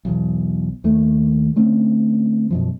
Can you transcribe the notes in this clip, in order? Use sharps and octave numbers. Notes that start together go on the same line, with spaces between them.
B1 E2
D#2 D#3 A3
D3 A3 C4 C#4
F#2 B2 F3